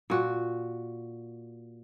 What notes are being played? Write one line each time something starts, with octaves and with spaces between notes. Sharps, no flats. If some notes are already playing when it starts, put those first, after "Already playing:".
A#2 F#4